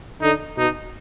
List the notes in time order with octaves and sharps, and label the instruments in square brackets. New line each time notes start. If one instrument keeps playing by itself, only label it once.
[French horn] D3 [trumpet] D#4
[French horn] B2 [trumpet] D#4